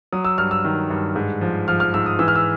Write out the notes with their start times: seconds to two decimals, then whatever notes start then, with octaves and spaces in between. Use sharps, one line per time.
0.13 F#3 D#6
0.25 E6
0.38 G2 F6
0.51 E6
0.65 D#3
0.90 G2
1.16 G#2
1.41 F3
1.68 F3 F6
1.80 F6
1.94 G#2 E6
2.06 D#6
2.19 E3 E6
2.28 F6
2.36 E6